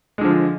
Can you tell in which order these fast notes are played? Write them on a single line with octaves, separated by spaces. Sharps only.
G#3 D3 F3